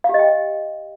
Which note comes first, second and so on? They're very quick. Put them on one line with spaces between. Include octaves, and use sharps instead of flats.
F5 G4 D#5 G5